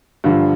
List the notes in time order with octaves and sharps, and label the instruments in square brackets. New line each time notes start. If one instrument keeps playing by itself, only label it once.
[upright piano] G2 D3 F3